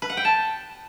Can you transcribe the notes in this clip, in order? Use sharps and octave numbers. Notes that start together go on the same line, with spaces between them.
B4
F#5
G5
A5